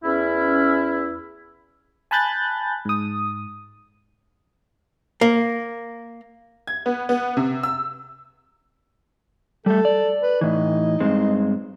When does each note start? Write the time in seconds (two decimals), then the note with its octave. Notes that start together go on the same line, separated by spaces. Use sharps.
0.04 E2 C#4 E4
2.11 G#5 A5 B5 F#6 G6 A6
2.85 G#2 D#6
5.21 A#3
6.67 G#6
6.86 B3
7.09 B3
7.37 C3
7.63 E6
9.66 G3 A3 A4
9.85 D5
10.22 B4
10.41 A2 E3 D#4
11.00 G2 G#3 C4